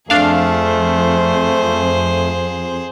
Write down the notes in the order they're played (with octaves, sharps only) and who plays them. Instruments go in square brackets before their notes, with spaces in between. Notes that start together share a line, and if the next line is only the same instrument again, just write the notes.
[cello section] F2 [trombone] A3 [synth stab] D4 F5 [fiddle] G#4 C5